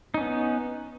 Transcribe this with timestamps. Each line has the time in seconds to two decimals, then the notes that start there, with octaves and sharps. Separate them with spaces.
0.14 D#4
0.18 C#4
0.21 B3